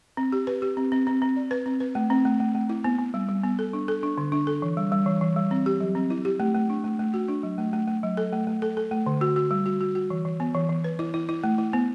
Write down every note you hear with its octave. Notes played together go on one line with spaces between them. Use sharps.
C4
G4
B4
G4
C4
C4
C4
C4
D5
B4
C4
B4
A3
C4
A3
A3
A3
E4
B3
B3
G3
G3
B3
A4
D4
A4
D4
D3
D4
A4
E3
G3
G3
E3
E3
G3
C4
G4
F#3
C4
E4
G4
A3
A3
D4
A3
A3
F#4
D4
F#3
A3
A3
A3
F#3
A4
A3
A3
A4
A4
A3
D3
F#4
F#4
G3
F#4
F#4
F#4
E3
E3
B3
E3
E3
B4
E4
E4
E4
A3
E4
B3